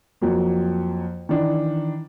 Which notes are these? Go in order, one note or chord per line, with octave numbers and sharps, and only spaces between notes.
F2 F#3 A#3
D#3 E3 D4